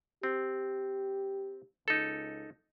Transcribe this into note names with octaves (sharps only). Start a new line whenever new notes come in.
C4 G4
C#2 D#4 A4